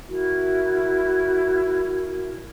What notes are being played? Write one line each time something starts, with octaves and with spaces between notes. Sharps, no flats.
E4 F#4 A#4